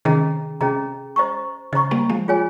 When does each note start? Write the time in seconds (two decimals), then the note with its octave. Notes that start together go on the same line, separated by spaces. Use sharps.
0.05 C3 D#3 C#4 G#4 D#5 A#5
0.61 C3 C#4 G#4 D#5 A#5
1.16 C5 D#5 A#5 C#6
1.73 C#3 C5 D#5 A#5 C#6
1.91 G3 A#3
2.10 F3 G#3
2.28 F4 G#4 C#5 G#5